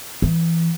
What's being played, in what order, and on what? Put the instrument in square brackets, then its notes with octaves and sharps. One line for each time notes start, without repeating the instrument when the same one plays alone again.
[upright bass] E3